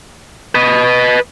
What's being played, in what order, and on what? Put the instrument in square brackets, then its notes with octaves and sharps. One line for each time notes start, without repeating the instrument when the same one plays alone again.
[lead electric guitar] B4 D#5